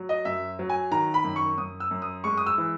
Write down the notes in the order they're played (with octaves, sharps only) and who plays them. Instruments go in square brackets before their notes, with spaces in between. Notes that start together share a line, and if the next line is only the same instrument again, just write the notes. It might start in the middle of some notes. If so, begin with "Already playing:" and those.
Already playing: [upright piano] F#3
D#5
F#2 E5
F#3
G#5
D#3 A#5
B5
F#2
C#6
F#2 D#6
E6
F#2
D#6
G#3 C#6
D#6
E6
E3